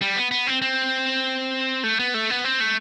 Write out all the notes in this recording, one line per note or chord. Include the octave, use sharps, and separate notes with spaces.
G3
B3
B3
C4
C4
A3
B3
A3
B3
C4
A3